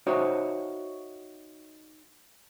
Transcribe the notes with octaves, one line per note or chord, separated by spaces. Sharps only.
D#4 F#4 C5 C#5 E5